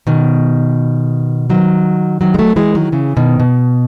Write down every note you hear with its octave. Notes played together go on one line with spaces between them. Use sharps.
B2 D#3
D#3 F#3
D#3 F#3
G#3
F#3 A3
E3 G#3
D#3 F#3
C#3 E3
B2 D#3
B2